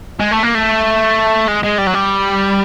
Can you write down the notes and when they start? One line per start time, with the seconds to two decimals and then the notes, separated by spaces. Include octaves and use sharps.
0.20 G#3
0.31 A3
0.43 A#3
0.55 A3
1.48 G#3
1.63 G#3
1.78 G3
1.87 F#3
1.94 G3